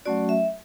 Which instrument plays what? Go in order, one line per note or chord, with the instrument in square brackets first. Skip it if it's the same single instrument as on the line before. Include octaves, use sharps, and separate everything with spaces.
[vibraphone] F#3 A3 C#4 F#4 D5
E5